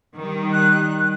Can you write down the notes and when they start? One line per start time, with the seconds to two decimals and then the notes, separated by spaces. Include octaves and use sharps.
0.17 D#3 G3
0.53 F#6